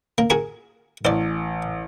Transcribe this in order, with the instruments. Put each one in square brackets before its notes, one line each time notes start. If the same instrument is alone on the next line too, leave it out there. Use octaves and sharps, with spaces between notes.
[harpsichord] A#3
F#4 G#4 A#4
[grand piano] A1 [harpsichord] C5 D5